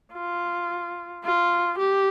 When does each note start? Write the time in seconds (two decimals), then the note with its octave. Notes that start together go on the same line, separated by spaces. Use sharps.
0.13 F4
1.24 F4
1.79 G4